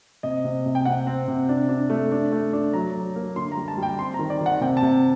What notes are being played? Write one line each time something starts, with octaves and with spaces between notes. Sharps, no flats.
C3 D#5
C3
C3
G5
C3 F#5
C4
C3
D4
D4
A3
D4
A3
D4
F#3 A#5
F#3
A#3
D3 C6
A#5
G3
A5
G3 G5
C4 C6
A#5
D#3
D5
D#3
F#5
C3 G5
A5
C3